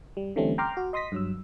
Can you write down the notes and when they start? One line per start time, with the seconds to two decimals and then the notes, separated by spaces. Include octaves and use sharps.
0.17 G3
0.36 D3 E3 G3 A3 C4 C#4
0.58 G5 A#5 C6 D6 F6
0.77 F#4
0.93 D#5 C6 D#6 A#6 B6
1.12 G2 F#3 E6